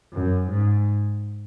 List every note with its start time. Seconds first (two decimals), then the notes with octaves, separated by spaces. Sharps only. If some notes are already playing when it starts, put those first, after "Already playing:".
0.13 F#2
0.49 G#2